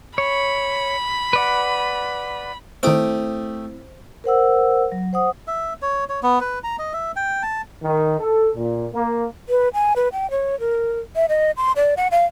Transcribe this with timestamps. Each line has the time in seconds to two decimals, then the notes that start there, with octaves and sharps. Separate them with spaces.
0.18 C#5 B5
1.33 B4 D5 F#5
2.83 D#3 A3 C4 E4 G4 C5 D#6 D7
4.24 A#4 C5 F#5 E6
4.92 F#3
5.13 C5 F#5 D#6
5.48 E5
5.82 C#5
6.09 C#5
6.23 B3
6.41 B4
6.64 A#5
6.79 D#5
6.93 E5
7.16 G5
7.43 A5
7.83 D#3
8.18 A4
8.54 A#2
8.93 A#3
9.49 B4
9.74 G#5
9.96 B4
10.13 G5
10.31 C#5
10.60 A#4
11.16 E5
11.29 D#5
11.57 C6
11.76 D5
11.97 F#5
12.11 F5